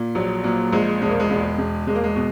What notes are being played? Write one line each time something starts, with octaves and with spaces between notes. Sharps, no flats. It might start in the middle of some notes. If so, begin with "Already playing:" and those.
Already playing: A#2
A#1 F#3
A#2 F#3
A#1 G#3
E1 G#3
A#3
G#3
E1
E1
E1 G#3
A#3
G#3
B2